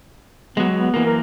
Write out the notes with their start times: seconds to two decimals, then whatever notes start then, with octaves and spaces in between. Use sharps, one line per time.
0.57 F#3 G#3 B3
0.73 B3
0.94 E3 A#3
1.06 A#4